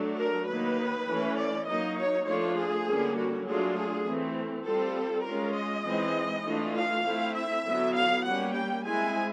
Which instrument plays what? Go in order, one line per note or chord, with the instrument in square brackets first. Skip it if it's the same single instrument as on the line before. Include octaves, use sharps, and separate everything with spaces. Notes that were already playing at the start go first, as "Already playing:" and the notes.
Already playing: [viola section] F#3 A3 D4
A#4
D#3 F#3 A#3 D#4 B4
E3 A3 C#4
D5
F#3 A#3 D#4 D#5
C#5
F3 A3 D4 F4 C#5
G#4
D3 G3 A#3 C#4
F#4
F#3 A3 D4 F4 G#4
G#4
E3 A3 C4
G3 C4 F4 A4
G#3 C#4 F4 A#4
D#5
E3 G#3 C4 D#4
E3 A3 D4 F4
F5
A3 C4 E4
E5
D3 F#3 B3 E4
F5
G3 A#3 C#4 F#5
G5
G#3 C4 E4 G#5